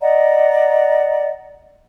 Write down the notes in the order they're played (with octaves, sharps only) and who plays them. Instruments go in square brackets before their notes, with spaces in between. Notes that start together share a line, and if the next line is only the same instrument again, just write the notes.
[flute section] D5 D#5 F#5 A#5